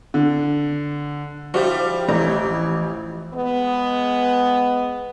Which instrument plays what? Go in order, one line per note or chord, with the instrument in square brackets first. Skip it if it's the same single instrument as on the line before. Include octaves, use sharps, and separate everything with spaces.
[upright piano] D3
[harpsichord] F3 E4 [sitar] G3 [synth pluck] F#4 G4 C5
[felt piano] A1 [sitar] E3 [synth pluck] A3 A#5
[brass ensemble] G#3 B3